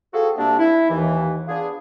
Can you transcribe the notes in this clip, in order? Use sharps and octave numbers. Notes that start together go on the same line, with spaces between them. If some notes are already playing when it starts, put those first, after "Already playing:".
C4 F4 F#4 G#4 A4
C3 G3 A3 A#3 C4 D4
E4
D#2 E3
B3 D4 F4 G#4